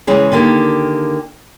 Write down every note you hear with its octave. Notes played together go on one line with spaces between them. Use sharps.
C#3 E3 G#3 C#4
D3 D#3 A#3 G4